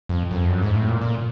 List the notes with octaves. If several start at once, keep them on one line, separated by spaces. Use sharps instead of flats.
F2
F#2
F2
F#2
G#2
A2
A#2
A#2